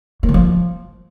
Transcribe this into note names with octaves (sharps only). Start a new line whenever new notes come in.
A#3
D#3
F3